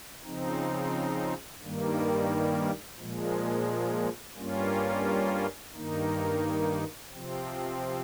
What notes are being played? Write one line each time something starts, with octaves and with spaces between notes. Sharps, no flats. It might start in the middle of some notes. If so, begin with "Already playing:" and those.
C#3 F3 C4 D#4
G2 D#3 G3 A#3
A#2 F3 G#3
G2 G3 A#3 C#4 F4
G2 D#3 A#3 D#4
C3 F3 C4